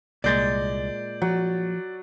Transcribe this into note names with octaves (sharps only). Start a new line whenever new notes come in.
C2 A#2 G#3 D5 G6 A6
F3 F#3